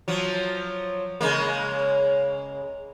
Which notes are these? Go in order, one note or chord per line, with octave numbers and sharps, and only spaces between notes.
F3 F#3
C#3 G#3 A#3